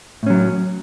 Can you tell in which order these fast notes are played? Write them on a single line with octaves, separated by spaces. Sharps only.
A2 C#4 F#3